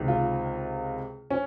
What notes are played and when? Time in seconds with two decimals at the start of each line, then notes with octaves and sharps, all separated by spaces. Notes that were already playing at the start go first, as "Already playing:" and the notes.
Already playing: C#2 C3 D#3
0.08 F4
1.30 C#4